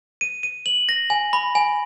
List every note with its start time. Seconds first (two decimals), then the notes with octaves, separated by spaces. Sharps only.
0.21 D#7
0.43 D#7
0.66 F#7
0.89 A#6
1.10 G#5
1.33 B5
1.55 G#5